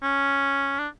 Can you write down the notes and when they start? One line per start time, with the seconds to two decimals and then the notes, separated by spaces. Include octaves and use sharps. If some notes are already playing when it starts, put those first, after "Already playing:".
0.03 C#4
0.79 D4